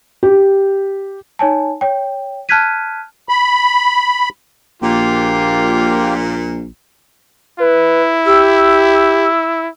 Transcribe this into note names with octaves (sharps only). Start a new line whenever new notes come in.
G4
D#4 C#5 G#5 A5
C#5 G5
A5 F6 F#6 G#6 B6 D#7
B5
A#1 A#2 A#3 F4 G4
E4 B4
G4 E6